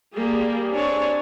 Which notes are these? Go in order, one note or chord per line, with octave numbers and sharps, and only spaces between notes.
G3 A#3 G4 G#4
C4 D4 C#5 G#5